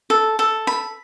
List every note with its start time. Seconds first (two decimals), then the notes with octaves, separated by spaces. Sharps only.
0.10 A4
0.39 A4
0.67 B5